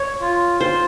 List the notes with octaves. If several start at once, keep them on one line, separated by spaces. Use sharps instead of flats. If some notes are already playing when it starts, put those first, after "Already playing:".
Already playing: C#5
F4
F4 C5